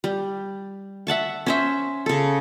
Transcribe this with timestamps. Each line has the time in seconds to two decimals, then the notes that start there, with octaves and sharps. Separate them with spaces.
0.04 G3
1.07 E5 F#5 A5 C#6
1.46 C#4 C5 E5
2.06 C#3 A4